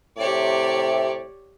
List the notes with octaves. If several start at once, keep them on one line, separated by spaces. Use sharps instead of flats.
A2 C3 G4 C#5 D5